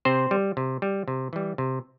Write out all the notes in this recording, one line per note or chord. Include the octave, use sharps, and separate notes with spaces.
C3 C4 C5
G3
C3
G3
C3
E3 G3
C3